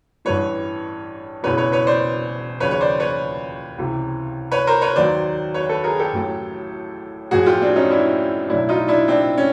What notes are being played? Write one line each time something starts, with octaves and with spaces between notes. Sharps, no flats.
A1 G2 E3 B4 C#5
E1 E2 C#3 E3 B4 C#5
B4 C#5
B4 C#5
C5 D5
D#2 C#3 F3 B4 C#5
C#5
C5 D5
B4 C#5
C#2 C3 E3
B4 C#5
A#4 C5
B4 C#5
D#2 D#3 F#3 C5 D5
B4 C#5
A4 B4
G#4 A#4
G4 A4
A1 A2 F#3
A1 A2 F3 F#4 G#4
F4 G4
C4 D4
C#4 D#4
D4 E4
B1 A2 F#3 D4 E4
D#4 F4
D4 E4
C4 D4
C#4